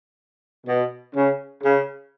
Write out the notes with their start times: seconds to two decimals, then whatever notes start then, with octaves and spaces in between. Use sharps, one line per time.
0.67 B2
1.15 C#3
1.63 C#3